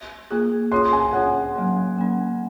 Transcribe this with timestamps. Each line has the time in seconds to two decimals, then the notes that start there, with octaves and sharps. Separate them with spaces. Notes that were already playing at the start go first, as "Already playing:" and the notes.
0.31 A#3 F4 G#4
0.72 C#4 F4 G#4 C#5 C6
0.93 G#5
1.13 C#4 F4 G#4 C#5 F#5
1.55 F#3 A#3 C#4
1.96 F#3 A#3 C#4